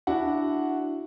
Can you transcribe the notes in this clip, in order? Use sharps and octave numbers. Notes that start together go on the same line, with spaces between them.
D4 E4 F#4 F#5